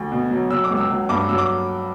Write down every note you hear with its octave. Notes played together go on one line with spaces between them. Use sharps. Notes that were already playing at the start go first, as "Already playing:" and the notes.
Already playing: D2
B2
F#3
F#3 E6
D6
C#2
E6
F#3
G2 D6
F#3 E6
D6